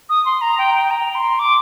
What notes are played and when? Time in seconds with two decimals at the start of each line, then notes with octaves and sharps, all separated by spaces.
0.09 D#6
0.26 C6
0.41 A#5
0.58 G5
0.75 G5
0.91 A#5
1.15 C6
1.39 D6